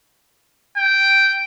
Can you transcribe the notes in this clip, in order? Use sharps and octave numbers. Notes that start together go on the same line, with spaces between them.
G5